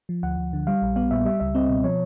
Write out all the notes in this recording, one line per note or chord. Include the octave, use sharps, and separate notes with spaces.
F3
D2 F#5
D2
D3
G3 F5
A#1
B3 F5
A#2 E5
G3 E5
C#2 E5
C4 D#5
B2
F3 C#5